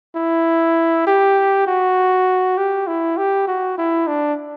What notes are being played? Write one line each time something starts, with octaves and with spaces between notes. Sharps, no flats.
E4
G4
F#4
G4
E4
G4
F#4
E4
D4